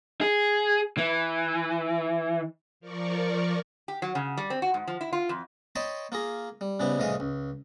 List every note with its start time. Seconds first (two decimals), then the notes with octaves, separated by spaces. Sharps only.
0.21 G#4
0.98 E3
2.80 F3 A#4 D5 C#6
3.88 G4
4.02 F#3
4.15 C#3
4.37 G3
4.50 C4
4.62 F#4
4.74 G#2
4.87 F3
5.01 E4
5.13 F4
5.29 F2
5.75 C#5 D#5 G5 A5 B5 C6
6.12 A#3 F4 G#4 A#5
6.61 G3
6.80 G#2 C#3 G3 B3 E4
6.99 C2 A2 E3 G#3 D#5 F5
7.20 C#2